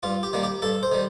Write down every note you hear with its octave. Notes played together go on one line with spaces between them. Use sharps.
G2 F4
G4
D#3 G3 A#3
G4
G2 A4
C5
D#3 G3